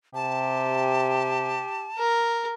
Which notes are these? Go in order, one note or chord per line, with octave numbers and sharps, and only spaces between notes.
C3 G4 A5
A#4